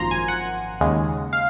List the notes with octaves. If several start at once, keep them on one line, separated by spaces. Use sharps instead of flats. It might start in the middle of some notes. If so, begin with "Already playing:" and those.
Already playing: G#1 F#2 F3 A#3 A#5 C6
G#5
F#5
D#2 C#3 G#3
F5